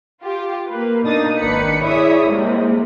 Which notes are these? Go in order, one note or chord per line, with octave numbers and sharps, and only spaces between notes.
F4 G4
A#3 B4
B2 A#3 D4 D#4 D#6 A6
G#1 D#3 D4 B4 B5 C#7
E4 G#4 C#5 D5 E5 D#6
G#2 C3 G3 G#3 A#3